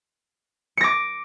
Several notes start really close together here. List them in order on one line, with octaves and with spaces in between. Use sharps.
C#7 A#6 D6